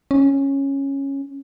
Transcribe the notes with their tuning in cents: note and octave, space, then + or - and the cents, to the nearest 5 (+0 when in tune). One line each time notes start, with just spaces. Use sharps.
C#4 -10